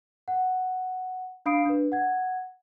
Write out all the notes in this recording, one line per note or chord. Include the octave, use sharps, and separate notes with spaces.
F#5
D4 F5 B5 D#6 C7 D7
D4 B4
F#5 G#6